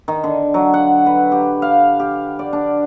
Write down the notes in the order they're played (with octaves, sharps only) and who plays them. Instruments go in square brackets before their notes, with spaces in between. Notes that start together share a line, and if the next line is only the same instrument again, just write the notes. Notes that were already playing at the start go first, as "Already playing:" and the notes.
[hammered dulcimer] D#3
D3
F#3
F#5
B4
G4
F5
G4
D5
D4